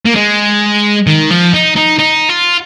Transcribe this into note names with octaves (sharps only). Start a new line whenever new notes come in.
A#3
G#3
D#3
F3
D#4
D#4
D#4
F4